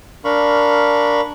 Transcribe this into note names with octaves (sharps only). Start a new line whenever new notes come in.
D4 A#4 F5 B5 C#6